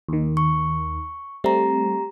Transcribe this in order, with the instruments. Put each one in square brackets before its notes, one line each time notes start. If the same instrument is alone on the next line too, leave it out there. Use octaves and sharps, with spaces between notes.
[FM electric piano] D#2 D#3
[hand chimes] C#6
[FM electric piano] G3 A3 C4 [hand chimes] G4 A#5